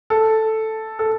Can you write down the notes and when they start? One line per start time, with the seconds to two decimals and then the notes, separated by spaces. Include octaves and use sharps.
0.10 A4
0.99 A4